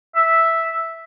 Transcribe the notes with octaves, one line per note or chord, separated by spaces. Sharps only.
E5